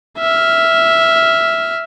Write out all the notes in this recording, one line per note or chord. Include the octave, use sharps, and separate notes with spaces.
E5 F6